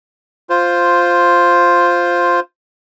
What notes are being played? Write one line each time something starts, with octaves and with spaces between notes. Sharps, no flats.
F4 C5